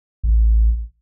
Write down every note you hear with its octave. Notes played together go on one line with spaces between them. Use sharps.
A1